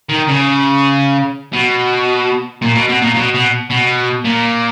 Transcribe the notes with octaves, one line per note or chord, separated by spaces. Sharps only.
D#3
C#3
B2
A#2
B2
B2
A#2
B2
B2
B2
A#2